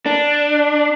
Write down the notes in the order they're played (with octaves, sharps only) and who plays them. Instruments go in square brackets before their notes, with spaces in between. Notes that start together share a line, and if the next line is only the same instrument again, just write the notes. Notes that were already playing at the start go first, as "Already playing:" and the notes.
[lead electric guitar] D4